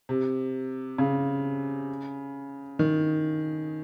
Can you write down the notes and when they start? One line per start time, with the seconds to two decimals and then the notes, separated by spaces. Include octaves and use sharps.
0.09 C3
0.98 C#3
2.79 D#3